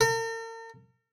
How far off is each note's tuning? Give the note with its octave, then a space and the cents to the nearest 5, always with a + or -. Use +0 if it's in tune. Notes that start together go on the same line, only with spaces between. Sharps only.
A#4 -45